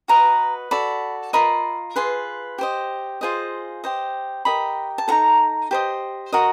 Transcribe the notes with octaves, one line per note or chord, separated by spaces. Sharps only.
F#4 B4 D#5 A#5
F#4 A4 D5 B5
F4 A#4 D#5 B5
F4 G#4 B4 C6
G4 C5 D#5
F4 G#4 C5 D#5
G4 C5 D#5
G4 A#4 D#5 B5
A5
D#4 F#4 A4 A#5
G4 C5 D#5
F#4 A#4 D#5